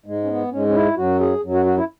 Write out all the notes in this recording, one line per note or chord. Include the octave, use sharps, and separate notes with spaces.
G#2 G#3
C#4
B3
G#2 G#3 C#4
C#4
E4
F#2 F#3 F#4
G#4
F#2 F#3
F#4
F#4
E4